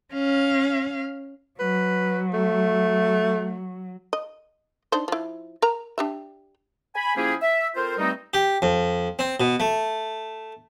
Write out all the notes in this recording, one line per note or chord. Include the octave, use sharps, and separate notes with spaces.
C#4 F5
F#3 B4
A3
D#5
D4 D#4 C5
F3 E4
A#4 A#5
D4 G4 E5
G#5 B5
F3 A#3 C#4 E4 G4 G#4
E5
C4 F4 A4 A#4 C5
G2 G3 A3 C4 D#4
G4
F2
C4
B2
A3